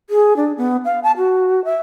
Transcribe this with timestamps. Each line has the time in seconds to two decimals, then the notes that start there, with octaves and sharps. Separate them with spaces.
0.10 G#4
0.36 D4
0.57 B3
0.85 F5
1.03 A5
1.17 F#4
1.65 E5